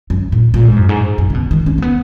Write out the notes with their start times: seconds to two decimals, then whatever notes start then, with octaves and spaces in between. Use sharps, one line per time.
0.10 F#2
0.32 A#2
0.54 A#2
0.65 G#2
0.76 F#2
0.89 G#2
1.18 F#2
1.30 C#3
1.34 B2
1.51 D#3
1.66 C#4
1.78 A#3
1.82 B3